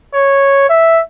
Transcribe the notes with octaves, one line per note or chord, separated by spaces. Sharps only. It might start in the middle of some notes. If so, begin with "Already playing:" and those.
C#5
E5